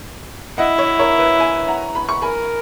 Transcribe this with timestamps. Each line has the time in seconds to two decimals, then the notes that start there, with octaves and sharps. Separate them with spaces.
0.58 E4 D#5 F#5
0.78 C#5 E5
0.99 A#4 C#5
1.19 B4
1.40 E5 G#5
1.68 F#5 A#5
1.95 B5
2.09 C#6
2.22 A#4 G#5 B5